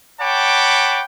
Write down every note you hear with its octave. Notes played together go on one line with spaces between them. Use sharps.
C#5 F#5 G5 A5 B5 D6